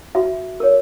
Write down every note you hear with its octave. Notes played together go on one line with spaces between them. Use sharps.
F#4 E5
A#4 C#5